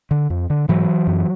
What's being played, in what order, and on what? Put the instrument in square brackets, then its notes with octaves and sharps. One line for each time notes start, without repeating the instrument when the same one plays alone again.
[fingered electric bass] D3
F2
D3
G#2 E3 F#3
F#2